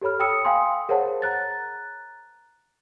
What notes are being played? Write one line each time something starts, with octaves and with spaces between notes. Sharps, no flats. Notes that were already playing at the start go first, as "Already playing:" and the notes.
G4 A4 C#5 B5 F6
G5 B5 D#6 E6 C#7
F5 G5 G#5 B5 C6 D#6
G#4 A#4 C5 C#5 F#5 A5
A#5 F#6 A6